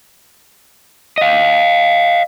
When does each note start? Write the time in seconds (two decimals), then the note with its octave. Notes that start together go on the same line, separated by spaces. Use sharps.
1.18 D#5 F5